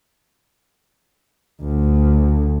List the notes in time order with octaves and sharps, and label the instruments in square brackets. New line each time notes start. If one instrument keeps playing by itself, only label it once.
[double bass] D2